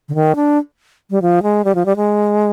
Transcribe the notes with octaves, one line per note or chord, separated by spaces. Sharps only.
D3
D#3
D4
G3
F3
G#3
G3
F3
G3
G#3